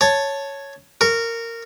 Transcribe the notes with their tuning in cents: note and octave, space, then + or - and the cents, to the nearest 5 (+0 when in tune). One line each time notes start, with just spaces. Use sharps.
C#5 +0 A5 +0
A#4 -15 C#6 +0